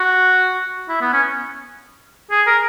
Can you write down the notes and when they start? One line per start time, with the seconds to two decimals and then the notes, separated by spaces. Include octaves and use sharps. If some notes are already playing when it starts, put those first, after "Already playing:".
Already playing: F#4
0.88 E4
1.01 B3
1.13 C#4
2.31 G#4
2.46 A#4